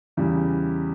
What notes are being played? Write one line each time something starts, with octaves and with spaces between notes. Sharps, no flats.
E2 C#3 E3 G3